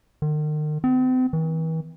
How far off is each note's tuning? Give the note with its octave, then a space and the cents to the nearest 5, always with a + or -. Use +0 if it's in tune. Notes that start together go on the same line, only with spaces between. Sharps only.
D#3 -40
C4 -40
E3 -40